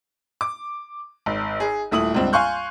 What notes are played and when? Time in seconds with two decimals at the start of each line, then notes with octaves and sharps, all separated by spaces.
0.41 D6
1.26 G#1
1.60 G#4
1.91 D#1 A3 E4 D#6 F#7
2.14 C#2 G2 C4
2.33 F5 G#5 C6 C#6 F#6 G6